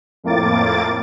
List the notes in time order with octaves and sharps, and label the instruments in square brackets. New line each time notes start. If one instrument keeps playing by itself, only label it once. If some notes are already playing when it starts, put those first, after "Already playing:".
[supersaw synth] F2 A2 A#3 D6 A6